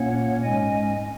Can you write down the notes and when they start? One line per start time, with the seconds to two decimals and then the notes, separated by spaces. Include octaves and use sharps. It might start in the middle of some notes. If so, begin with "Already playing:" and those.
Already playing: A#2 A#3 C#4 C#5 F#5
0.43 G#2 G#3 C#4 D#5 G#5